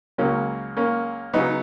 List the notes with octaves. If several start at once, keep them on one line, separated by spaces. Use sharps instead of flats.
C#2 C#3 F#3 A#3 C#4
A#3 C#4
C#3 F#3 B3 D#4